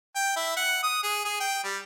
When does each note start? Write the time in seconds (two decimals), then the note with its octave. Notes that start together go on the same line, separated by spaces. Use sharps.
0.16 G5
0.36 E4
0.57 F#5
0.83 D#6
1.04 G#4
1.25 G#4
1.40 G5
1.64 G3